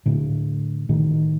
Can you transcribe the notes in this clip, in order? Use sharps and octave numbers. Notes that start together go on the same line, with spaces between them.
A2 D3
A2 D#3